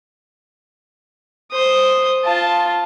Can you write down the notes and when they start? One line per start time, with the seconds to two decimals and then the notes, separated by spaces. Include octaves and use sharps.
1.52 C5 D#6
2.24 F4 A5